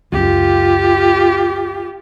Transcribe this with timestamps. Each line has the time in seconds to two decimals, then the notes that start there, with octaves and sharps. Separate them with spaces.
0.12 C#2 F#2 F4 G4